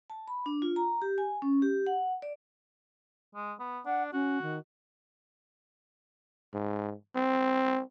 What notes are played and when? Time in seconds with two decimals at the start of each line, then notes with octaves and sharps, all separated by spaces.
0.10 A5
0.28 B5
0.46 D4
0.62 F4
0.76 A#5
1.02 G4
1.18 G#5
1.42 C#4
1.62 G4
1.87 F#5
2.22 D5
3.35 G#3
3.60 B3
3.86 D4 F#5
4.13 C#4 F#4
4.42 D#3
6.54 G#2
7.15 C4